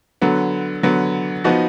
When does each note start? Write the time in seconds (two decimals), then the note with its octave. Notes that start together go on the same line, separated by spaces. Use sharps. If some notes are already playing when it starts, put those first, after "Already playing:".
0.22 D3 F#3 B3
0.83 D3 F#3 B3
1.44 F3 B3 D#4 F#4